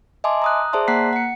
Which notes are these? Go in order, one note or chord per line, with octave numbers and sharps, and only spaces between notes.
D#5 E5 G#5 A5 C6 D6
A#5 D#6 F#6
G#4 C5 D5 E5 A5 C6
A#3 F#5 A#5 F#6 B6 C7
F#5 C#7